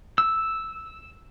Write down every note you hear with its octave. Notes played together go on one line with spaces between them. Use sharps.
E6